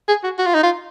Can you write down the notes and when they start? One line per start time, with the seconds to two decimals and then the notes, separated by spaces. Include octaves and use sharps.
0.08 G#4
0.24 F#4
0.39 F#4
0.46 F4
0.54 D#4
0.63 F4